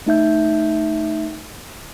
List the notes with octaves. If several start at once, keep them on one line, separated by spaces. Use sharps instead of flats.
A3 D#4 E5 G6